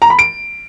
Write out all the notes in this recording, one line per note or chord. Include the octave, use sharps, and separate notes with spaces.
A#5
B5
D7